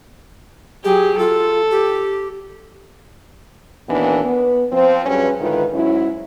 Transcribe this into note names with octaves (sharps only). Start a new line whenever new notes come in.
F#3 G4 G#4
F4 A4
G4
D#2 A#2 D#3 E3 B3 D4
B3
F3 C4 C5
G2 F#3 C#4 G#4 B4 C#5
G#2 D3 D#3 E4 F4 B4
G#2 F#3 C#4 E4